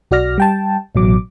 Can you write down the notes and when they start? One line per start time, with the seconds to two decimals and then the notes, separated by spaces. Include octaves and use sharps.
0.11 B1 F#4 D5 F6 A#6
0.38 G3 G5 A5
0.95 A1 B2 F#3 D6